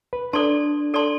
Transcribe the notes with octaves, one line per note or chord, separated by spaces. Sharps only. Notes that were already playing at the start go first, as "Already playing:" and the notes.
B4
D4 A4 D5 A5 C6
A4 D5 A5 C6